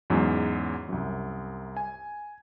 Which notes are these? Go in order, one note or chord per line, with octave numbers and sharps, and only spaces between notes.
E2 G#2 F#3 C#4
C2 F#2
G#5